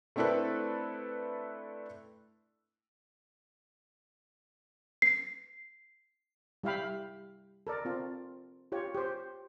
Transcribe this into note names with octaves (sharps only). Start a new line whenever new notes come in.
A3 C4 D4 E4 A4 B4
C7
G3 E4 E5 F5 G5 B5
A4 A#4 D5
C4 F4
F4 G4 C#5
G4 C5